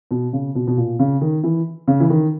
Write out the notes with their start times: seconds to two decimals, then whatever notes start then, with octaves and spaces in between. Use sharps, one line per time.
0.11 B2
0.33 C#3
0.55 B2
0.67 B2
0.77 A#2
0.99 C#3
1.21 D#3
1.43 E3
1.88 C#3
2.00 E3
2.10 D#3